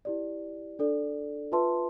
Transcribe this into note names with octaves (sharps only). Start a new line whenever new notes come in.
E4 G4 D5
D4 A4 D5
F4 B4 E5 A5 C6